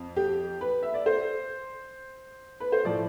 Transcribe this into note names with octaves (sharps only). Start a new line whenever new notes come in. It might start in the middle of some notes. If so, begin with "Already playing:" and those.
Already playing: F2
G4
B4
E5
D5
C5
B4
C5
A2 F3 D5